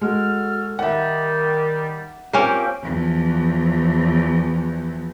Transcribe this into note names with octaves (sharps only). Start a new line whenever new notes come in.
G#3 F#4 A4 F6
D#3 G3 E5 F#5
F3 A#3 C4 C#4 G4
E2 F3